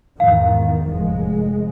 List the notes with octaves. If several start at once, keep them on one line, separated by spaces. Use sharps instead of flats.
E2 G#2 D#3 F5
F1 G#3